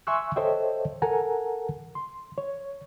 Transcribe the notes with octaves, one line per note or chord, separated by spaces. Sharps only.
E5 G#5 C6 C#6 E6 F#6
A4 C5 C#5 D#5 E5 G5
A4 A#4 F#5 G#5 A#5
C6
C#5